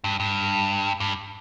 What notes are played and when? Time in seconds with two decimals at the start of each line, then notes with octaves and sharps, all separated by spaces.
0.04 G2
0.20 G2
1.00 G2